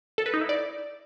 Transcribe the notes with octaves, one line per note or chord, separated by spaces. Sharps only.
A4
B4
D#4
E4
D5